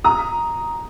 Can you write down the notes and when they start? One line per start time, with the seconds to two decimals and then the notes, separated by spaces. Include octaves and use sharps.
0.04 A#5 D#6